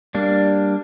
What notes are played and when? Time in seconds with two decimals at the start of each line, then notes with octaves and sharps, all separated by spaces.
0.15 G3 A#3 D4